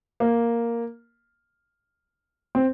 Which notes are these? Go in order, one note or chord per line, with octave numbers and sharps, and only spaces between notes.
A#3
C4